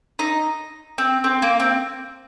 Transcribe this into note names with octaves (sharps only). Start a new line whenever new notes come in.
D#4
C4
C4
A#3
C4